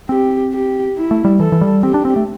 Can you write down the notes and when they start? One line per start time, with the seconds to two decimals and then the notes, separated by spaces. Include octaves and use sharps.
0.09 C4 G4
0.53 G4
0.96 E4
1.11 A3
1.25 G3
1.40 E3 A4
1.52 E3
1.61 G3
1.83 C4 G4
1.94 D4
2.05 C4
2.16 A3